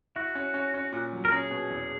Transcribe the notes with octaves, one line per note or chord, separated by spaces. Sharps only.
E4 F#4
C#4
C#4
C#4
A#2
F#3
A#4
C#4 G#4
B2
E2